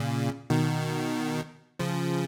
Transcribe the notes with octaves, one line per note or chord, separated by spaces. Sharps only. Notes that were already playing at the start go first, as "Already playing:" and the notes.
Already playing: A#2 C#3
B2 D#3
C#3 F3